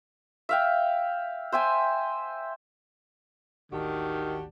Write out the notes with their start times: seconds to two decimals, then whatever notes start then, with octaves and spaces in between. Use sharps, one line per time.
0.49 E5 F5 G5
1.52 C5 E5 G5 G#5
3.72 A1 D#2 D#3 D4 F#4 G4